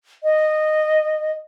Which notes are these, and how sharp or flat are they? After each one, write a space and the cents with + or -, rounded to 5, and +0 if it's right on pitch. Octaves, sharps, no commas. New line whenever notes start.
D#5 -15